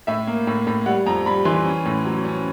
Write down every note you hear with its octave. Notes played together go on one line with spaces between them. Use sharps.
A2 E5
A#3
A2
A2
G3 F#5
F2 A#5
G3 B5
E3 C6
C#4
A2
F#3
C#4